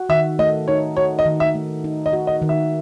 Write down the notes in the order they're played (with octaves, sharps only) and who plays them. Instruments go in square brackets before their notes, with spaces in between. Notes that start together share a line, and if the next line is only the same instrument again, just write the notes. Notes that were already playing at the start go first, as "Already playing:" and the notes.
Already playing: [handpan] F#4
[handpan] D#3 [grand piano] E5
[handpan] A3 [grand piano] D#5
[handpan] D#4 [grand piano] C#5
[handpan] F#4 [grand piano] C#5
[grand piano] D#5
[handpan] D#3
[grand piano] E5
[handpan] A3
D#4
[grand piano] D#5
[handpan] F#4
[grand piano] D#5
[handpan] D#3
[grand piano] E5